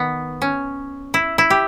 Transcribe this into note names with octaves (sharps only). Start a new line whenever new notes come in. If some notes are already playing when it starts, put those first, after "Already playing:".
Already playing: D#3 B3
C#4
E4
E4
G4